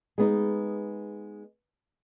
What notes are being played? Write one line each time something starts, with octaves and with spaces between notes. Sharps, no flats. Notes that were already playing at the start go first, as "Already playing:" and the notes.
G#3 B3 D#4